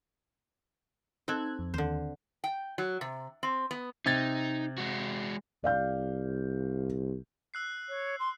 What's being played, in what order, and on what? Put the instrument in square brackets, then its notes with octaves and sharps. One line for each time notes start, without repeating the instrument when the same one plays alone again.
[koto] C4 A4 [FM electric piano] D#4 F#6 G#6
[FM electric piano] F2
[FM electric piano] D#2 [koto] D3 C5
[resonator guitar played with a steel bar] G5
F#3
C3
C4
B3
[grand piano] C3 G#6 A6 [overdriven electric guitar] D#4
[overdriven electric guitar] G#3 F#4
[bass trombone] C2 [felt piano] D5 F5 G6
[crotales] E6 F#6 C7
[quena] C#5
C6